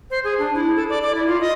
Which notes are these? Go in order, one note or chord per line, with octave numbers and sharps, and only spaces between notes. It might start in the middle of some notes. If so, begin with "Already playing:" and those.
C5
G#4
D4
E4
A4
D5
D5
E4
F4
D#5